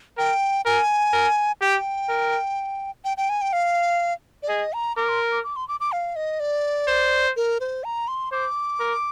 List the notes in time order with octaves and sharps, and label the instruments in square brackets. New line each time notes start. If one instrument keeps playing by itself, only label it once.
[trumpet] A#4 [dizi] G5
[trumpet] A#4 [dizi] G#5
[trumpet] A#4
[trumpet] G4 [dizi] G5
[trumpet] A#4
[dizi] G5
G5
G#5
G5
F5
D5
[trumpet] G#4 [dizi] D#5
[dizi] A#5
[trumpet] A#4 [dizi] D6
[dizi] C6
D6
D6
C6
D6
D6
F5
D#5
D5
[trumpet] C5
[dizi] A#4
C5
A#5
C6
[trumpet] C5 [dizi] D6
[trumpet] A#4